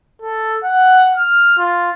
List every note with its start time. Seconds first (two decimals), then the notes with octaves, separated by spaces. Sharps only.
0.22 A4
0.64 F#5
1.15 F6
1.58 F4